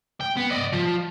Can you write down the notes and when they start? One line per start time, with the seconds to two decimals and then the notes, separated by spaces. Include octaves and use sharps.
0.21 G5
0.37 B3
0.51 D5 D#5
0.73 F3